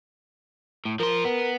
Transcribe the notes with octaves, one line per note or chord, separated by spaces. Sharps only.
A2
F3 A#4 C6
B3